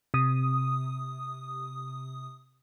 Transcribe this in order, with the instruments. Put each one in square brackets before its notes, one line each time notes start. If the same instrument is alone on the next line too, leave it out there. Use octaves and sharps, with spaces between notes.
[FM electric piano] C3 D#6